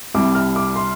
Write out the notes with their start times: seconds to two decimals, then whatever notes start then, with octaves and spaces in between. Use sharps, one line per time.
0.14 C2 C3 G3 D6
0.35 F6
0.56 D6
0.76 C6